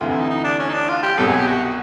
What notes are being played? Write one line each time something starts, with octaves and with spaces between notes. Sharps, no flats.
D2 C3 E3 F4
E4
D#4
D#4
D4
C#4
D#4
D4
F4
G4
C2 B2 F#3 A4
G#4
G4
F#4
F#4